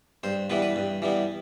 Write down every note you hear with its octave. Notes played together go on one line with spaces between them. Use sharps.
G2 C5
E3 G3 B3 B4
B4
G2
E3 G3 B3